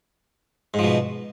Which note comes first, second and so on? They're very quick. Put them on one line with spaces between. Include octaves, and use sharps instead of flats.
G#2 F3 B2